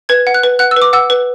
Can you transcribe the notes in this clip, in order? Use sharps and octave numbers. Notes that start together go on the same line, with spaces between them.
B4 G#6
F#5
F#6
B4
F#5 F#6
E6
B4
D6
F#5 E6
B4